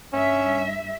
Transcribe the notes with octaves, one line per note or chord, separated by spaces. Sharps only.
G2 C#4 E5